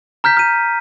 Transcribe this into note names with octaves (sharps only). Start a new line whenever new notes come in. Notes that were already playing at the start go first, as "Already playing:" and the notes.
A#5 F6 G6 B6
F6 D#7